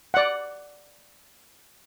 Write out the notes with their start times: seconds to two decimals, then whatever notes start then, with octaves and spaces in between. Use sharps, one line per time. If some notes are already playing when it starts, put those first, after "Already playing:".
0.14 D5 F#5